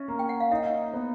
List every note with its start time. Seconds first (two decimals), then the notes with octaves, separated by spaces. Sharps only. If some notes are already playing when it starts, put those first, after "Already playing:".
Already playing: C#4 E5
0.08 A#3
0.19 G5
0.29 F#5
0.40 F5
0.52 D#4 E5
0.94 B3